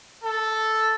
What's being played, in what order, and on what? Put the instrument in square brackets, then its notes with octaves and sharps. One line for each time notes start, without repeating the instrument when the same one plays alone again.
[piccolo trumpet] A4